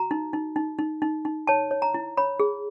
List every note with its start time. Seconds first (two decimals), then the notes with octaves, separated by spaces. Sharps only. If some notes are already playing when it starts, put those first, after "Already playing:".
Already playing: F#4 A#5
0.11 D#4
0.33 D#4
0.56 D#4
0.79 D#4
1.02 D#4
1.25 D#4
1.47 C#5 A5
1.71 C#5
1.82 A#5
1.94 E4
2.17 C#5 B5
2.40 G#4